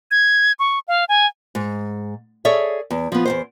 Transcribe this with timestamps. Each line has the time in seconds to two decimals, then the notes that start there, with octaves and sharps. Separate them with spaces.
0.11 G#6
0.59 C#6
0.88 F5
1.09 G#5
1.55 G#2
2.45 G#4 A4 C#5 D5 E5
2.90 E2
3.12 F3 B3
3.25 E2 A#2 C5